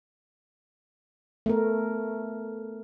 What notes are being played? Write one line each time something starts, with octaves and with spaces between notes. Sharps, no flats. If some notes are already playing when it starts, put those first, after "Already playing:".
A3 B3 A#4